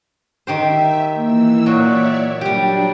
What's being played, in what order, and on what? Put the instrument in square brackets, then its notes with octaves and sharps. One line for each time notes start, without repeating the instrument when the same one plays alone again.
[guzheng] D#3 G4 C5 [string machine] E5
[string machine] E3 E6 [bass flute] A#3
[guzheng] A#2 F#3 F#4 [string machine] C#5 D5 E5
[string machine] F#3 D4 [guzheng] G3 G4